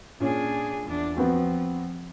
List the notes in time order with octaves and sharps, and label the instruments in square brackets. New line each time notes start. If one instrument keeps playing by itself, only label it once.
[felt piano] A#2 C#4 [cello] D4 G#4
[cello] E2 D4
[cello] F3 [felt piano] B3 C4 F#4